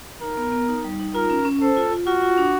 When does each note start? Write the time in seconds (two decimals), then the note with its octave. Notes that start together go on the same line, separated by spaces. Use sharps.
0.22 D#4 A#4
0.37 B3
0.52 B3
0.68 D#4
0.84 G3
0.99 D#4
1.15 F4 A#4
1.30 C#4
1.45 C#4
1.61 A4 C5
1.77 F4
1.92 F4
2.07 F4 F#4
2.22 F4
2.38 D4